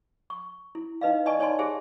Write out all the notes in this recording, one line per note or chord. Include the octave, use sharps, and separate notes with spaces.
C#6
E4
D#4 B4 D#5 F5
D5 D#5 G#5 A5 C#6
D#4 C#5 D5 G#5 A5 C6
G4 G#4 C5 E5 G#5